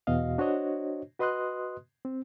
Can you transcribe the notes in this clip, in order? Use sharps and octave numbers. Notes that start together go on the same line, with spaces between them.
E2 B2 F#4 D#5 F5
D4 F#4 C5 C#5 D#5
F#4 B4 D#5 C6 D#6 F#6
C4